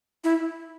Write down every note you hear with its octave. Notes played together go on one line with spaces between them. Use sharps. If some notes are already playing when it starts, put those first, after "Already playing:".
E4